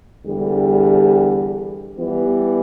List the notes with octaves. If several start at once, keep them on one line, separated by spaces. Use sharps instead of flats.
E2 D3 G3
E3 G3 B3